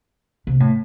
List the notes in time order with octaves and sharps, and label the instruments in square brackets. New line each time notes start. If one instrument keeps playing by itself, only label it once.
[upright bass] C3
A2